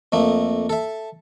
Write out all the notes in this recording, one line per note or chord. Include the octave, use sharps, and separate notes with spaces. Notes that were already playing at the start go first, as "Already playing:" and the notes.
F2 A3 A#3
A4 E5